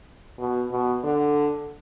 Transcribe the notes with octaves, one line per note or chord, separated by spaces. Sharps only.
B2
B2
D3